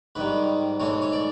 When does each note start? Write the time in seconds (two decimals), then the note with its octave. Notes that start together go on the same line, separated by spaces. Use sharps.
0.15 G#2 D#3 G3 B4
0.80 G#2 E3 A3 C#5
1.02 C#5
1.12 D5